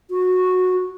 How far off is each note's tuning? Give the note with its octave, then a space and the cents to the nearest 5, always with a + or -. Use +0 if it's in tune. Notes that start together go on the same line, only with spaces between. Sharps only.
F#4 -10